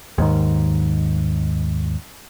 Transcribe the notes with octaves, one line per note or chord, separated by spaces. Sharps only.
D#2 G#2 D#3